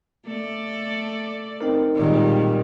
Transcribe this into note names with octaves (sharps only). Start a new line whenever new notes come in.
A3 A4 D5
C4 D#4 A#4
A#2 D#3 G3 G#3